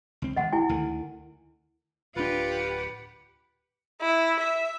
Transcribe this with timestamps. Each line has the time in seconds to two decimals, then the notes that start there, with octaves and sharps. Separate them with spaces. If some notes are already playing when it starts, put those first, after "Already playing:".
0.22 C#2 C4
0.36 G#1 D#5 F#5
0.53 E4 G#5
0.69 D2 D3 D#3
2.16 D1 D4 F4 G4 B4 F#5
4.01 E4
4.40 E5